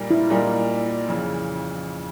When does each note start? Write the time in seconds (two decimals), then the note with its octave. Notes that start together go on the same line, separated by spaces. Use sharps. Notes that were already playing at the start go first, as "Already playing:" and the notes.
Already playing: A#2 G3 A#3 D#4
0.11 E4
0.30 A#2 G3 A#3 D#4
1.08 F2 C#3 E3